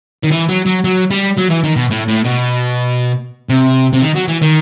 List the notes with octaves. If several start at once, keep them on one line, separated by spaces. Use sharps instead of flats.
D#3
E3
F#3
F#3
F#3
G3
F#3
E3
D#3
B2
A2
A2
B2
C3
C3
D#3
F#3
E3
D#3